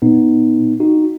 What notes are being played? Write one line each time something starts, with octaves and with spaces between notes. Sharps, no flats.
A#2 B3 D#4
D#4 F#4